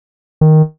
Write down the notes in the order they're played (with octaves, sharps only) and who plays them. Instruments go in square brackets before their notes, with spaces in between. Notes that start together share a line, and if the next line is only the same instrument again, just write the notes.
[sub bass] D#3